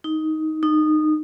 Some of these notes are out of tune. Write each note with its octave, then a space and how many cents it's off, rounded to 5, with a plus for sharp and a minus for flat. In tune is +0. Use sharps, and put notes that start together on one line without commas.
D#4 +10
D#4 -20